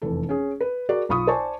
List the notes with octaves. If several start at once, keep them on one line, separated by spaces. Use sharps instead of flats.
F1 E2 A4
C#4 G#4
B4
F#4 G#4 A#4 D5
B1 F4 B5 C#6 D#6
C5 D5 G#5 A5 C#6